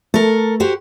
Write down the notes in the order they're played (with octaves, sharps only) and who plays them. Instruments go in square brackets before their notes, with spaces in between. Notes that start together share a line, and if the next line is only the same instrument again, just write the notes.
[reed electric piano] A3 [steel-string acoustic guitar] A4 A#4
[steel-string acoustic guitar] F#4 G4 C5